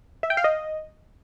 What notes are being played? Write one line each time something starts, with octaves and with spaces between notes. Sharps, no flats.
E5
G5
F5
D#5